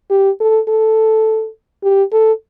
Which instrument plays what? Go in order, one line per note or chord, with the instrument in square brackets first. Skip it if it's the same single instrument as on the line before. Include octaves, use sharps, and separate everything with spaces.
[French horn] G4
A4
A4
G4
A4